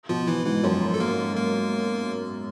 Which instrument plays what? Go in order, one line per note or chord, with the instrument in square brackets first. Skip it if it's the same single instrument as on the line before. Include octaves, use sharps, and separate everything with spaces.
[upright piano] B2 [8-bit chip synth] F3 F4
[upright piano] B2 [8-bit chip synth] E3 E4
[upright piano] G#2 [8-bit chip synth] E3 E4
[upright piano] F#2 [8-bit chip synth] F3 F4
[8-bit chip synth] A4
A#3 A#4
A#3 A#4